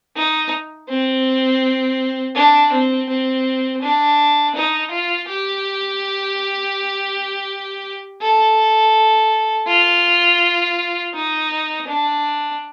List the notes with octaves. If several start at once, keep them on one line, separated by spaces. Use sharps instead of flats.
D#4
C4
D4
C4
C4
D4
D#4
F4
G4
A4
F4
D#4
D4